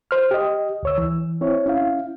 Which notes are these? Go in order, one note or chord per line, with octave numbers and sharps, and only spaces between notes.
C5 F6
G4 D#5
D2 C#5 E6
E3
C4 E4 C#5
C#4 E4 F5